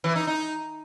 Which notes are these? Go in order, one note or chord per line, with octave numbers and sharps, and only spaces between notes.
E3
D#4
D#4